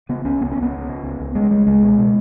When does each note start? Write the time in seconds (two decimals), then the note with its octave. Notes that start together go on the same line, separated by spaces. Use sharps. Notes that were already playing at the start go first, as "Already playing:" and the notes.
0.09 C#3 B3
0.25 C#2 C#4
0.41 C#2 B3
0.52 C#2 C#4
0.63 B3
0.72 C#3
0.89 C#3
1.03 C#2
1.20 C#2
1.35 C#3 G#3
1.50 C#2 G#3
1.67 C#2 G#3
1.83 B2
1.98 B2